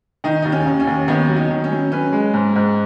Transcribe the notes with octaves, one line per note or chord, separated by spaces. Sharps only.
D#3 D#4
D#2 D#4
C#4
D#2
C#4
D#2
D#3 B3
F#3
D#4
D#3
C#4
F#3
C#4 B4
G#3
G#2
G#2